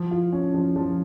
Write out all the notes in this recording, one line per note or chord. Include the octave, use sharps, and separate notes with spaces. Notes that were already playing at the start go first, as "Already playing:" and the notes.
Already playing: F3
F4
C#4
F3
F3